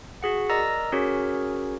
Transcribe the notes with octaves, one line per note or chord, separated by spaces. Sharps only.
F#4 G#4 F#5
A#4 D5 D#5 A#5 E6 A#6
C#4 F#4 G#4 A#4 C#5